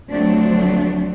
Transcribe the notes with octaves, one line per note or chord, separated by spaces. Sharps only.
D2 F3 F#3 A3 C4 D4